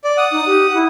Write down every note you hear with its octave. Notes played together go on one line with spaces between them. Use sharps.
D5
F#5 D#6
D#4
G4
E4